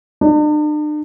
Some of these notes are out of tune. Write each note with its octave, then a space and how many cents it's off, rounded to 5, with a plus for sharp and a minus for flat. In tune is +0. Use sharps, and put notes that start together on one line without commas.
D4 +45